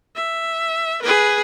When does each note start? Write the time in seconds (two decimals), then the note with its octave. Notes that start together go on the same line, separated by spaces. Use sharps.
0.16 E5
1.02 G#4 B4